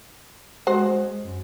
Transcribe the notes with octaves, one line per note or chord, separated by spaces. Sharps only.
G#3 F#4 C5
F#2